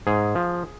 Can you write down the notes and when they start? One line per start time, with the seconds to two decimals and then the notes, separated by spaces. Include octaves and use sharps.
0.07 G#2 G#4
0.35 F3